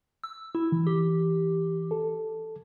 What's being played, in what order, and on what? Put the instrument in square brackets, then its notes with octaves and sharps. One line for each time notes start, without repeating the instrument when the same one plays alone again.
[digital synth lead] E6
E4
[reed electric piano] E3
[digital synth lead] G4
[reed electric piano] A4